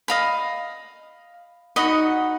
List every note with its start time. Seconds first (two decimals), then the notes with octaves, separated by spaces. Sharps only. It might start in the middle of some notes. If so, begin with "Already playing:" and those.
0.08 D#5 F5 B5
1.76 D#4 F#4 D#5 B5